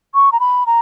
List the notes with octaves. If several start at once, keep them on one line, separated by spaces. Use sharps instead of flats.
C#6
A#5
B5
A#5